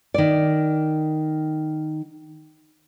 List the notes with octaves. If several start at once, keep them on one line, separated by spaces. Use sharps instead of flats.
D#3 D5